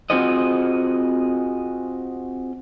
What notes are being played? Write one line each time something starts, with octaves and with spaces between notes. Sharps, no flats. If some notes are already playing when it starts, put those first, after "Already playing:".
C4 F4 F#4 G#4 C5 D#5